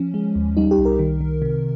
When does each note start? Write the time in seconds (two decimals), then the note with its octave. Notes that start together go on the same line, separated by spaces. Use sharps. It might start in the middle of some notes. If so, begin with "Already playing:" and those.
Already playing: F3 C#4
0.14 G#3
0.35 D#2
0.57 G3 D#4
0.71 G4
0.78 C2
0.85 A#4
0.99 D#3
1.21 D#3
1.42 C3